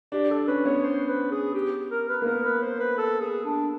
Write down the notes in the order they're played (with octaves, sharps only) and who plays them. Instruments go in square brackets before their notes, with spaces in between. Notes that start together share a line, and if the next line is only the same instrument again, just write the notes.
[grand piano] D4 [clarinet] G4
[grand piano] D4 [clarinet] A4
[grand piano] C#4 [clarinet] B4
[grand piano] B3 [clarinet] C#5
[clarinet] C5
B4
G#4
G4
A#4
B4
[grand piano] A#3
[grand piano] B3 [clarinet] A#4
[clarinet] B4
C5
B4
A4
G#4
D4